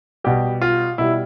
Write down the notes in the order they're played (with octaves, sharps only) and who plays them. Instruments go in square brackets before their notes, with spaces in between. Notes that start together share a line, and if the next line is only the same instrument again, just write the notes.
[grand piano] B2 G3 G4
F4
B2 G3 E4